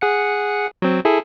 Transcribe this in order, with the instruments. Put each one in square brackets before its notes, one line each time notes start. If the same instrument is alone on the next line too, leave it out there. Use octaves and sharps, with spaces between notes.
[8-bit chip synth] G#4 F#5 C#7
F#3 C4
E4 G#4 A4